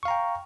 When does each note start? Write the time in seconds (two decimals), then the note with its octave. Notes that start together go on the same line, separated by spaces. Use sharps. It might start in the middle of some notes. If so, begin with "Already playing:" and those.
0.03 C#6
0.05 F5
0.08 A#5
0.11 G5